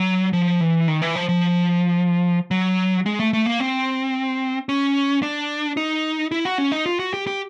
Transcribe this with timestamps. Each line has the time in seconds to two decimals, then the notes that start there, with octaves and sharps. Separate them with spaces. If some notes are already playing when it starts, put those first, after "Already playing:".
Already playing: F#3
0.33 F3
0.61 E3
0.88 D#3
1.02 E3
1.16 F3
1.29 F3
2.51 F#3
3.06 G#3
3.19 A3
3.33 A3
3.46 A#3
3.60 C4
4.69 C#4
5.23 D4
5.77 D#4
6.32 E4
6.45 F#4
6.58 C#4
6.72 D#4
6.86 F4
6.99 F#4
7.14 G4
7.27 G4